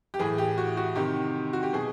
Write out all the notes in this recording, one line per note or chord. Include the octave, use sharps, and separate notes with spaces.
G4
A2 E3 G#4
G4
F#4
F#4
C3 D#3 G4
F#4
G4
B2 G#4